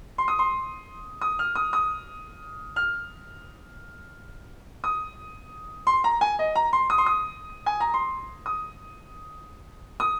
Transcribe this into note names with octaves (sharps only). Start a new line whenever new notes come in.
C6
D#6
C6
D#6
F6
D#6
D#6
F6
D#6
C6
A#5
G#5
D#5
A#5
C6
D#6
C6
D#6
G#5
A#5
C6
D#6
D#6